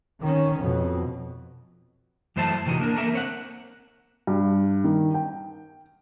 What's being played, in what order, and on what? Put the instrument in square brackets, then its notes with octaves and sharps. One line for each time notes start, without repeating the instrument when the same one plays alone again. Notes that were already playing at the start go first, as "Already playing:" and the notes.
[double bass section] D#3 C#4
F2 B2
[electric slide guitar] F#2 E3 A3 C5 E5 A5
A2 C3 E3 D#4 F#4
A#3 D4 A#4
A3 A#3 A#4 E5
C4 C#5 F#5
[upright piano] G2
D#3
G5